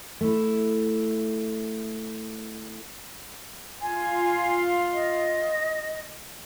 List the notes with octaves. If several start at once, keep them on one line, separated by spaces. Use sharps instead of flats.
A3 E4
F4 G#5
D#5